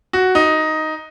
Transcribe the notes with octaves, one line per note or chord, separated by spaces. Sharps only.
F#4
D#4